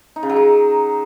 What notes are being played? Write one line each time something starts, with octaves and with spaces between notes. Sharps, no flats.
D#4
C#3
F#3
D#4